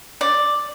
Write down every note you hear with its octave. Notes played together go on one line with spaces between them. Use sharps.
D5